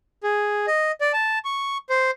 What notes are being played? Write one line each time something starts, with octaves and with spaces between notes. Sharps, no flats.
G#4
D#5
D5
A5
C#6
C5